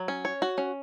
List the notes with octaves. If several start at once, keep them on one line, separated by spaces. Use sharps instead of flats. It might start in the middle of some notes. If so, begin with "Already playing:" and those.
Already playing: F#3
C#4
C#5
F#4
C#4